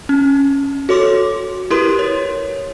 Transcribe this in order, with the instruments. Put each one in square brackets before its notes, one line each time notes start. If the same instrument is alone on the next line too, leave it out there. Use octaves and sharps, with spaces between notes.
[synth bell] C#4
F#4 A4 C#5 C6 D6
E4 G4 A#4 B4 C6
C#5